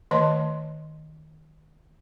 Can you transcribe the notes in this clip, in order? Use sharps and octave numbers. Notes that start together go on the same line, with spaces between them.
D#3 A3 C#5 D#5 A5 C6